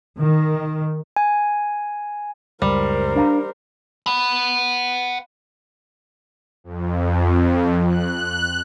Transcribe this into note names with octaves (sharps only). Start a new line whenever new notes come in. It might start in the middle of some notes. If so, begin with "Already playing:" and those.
D#3
G#5
C#2 F#2 G3 A#4 C5
D4 F5 A#5
F#5 B5
F2
F#6